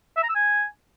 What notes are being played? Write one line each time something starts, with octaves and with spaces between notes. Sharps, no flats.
E5
A#5
E6
G#5